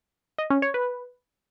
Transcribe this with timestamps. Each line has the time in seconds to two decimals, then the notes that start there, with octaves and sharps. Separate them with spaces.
0.38 D#5
0.50 C#4
0.62 C#5
0.74 B4